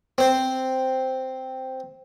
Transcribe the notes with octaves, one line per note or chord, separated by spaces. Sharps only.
C4 C5